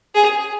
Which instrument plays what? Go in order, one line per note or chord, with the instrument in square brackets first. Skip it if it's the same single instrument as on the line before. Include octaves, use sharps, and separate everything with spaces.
[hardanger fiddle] G#4